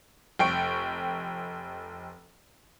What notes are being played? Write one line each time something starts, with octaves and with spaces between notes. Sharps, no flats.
F1 G5 C#6 D7